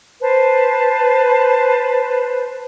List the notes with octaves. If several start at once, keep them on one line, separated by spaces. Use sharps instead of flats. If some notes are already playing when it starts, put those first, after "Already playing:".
B4 C5 A5